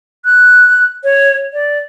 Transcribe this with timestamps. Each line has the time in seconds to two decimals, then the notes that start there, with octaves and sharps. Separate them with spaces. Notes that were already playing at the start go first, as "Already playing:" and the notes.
0.25 F#6
1.04 C#5
1.53 D5